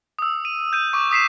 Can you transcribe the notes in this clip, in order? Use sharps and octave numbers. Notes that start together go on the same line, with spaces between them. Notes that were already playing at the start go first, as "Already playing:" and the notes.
D#6 E6
D#7
G6 D#7
C#6 D6
D#6 B6 C7 E7